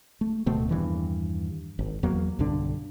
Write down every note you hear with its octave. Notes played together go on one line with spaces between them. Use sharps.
A3
D1 B2 A3 C4
E2 G2 D#3 E3
G#1
E2 F#3 A#3
B1 G2 D3 D4